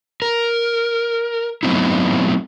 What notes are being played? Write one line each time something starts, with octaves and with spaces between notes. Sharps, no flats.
A#4
F#3 A3 B3 C4 D#4 E4